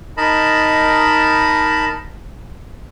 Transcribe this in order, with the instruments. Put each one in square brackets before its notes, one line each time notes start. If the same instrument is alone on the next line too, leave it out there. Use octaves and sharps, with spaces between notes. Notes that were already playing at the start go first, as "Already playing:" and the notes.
[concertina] D#4 A#4 D#5 A5 B5